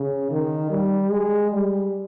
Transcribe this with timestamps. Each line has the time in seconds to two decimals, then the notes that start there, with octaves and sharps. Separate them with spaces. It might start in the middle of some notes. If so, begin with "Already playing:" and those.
Already playing: C#3
0.30 D#3
0.70 G3
1.09 G#3
1.50 G3